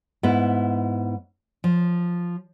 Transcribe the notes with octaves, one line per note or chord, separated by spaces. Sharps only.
G#2 B3 E4
F3